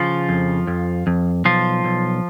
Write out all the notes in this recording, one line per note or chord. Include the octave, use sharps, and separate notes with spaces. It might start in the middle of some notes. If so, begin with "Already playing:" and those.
Already playing: C#3 F3 F4
F2
F2
F2
B1 F3 F4
B1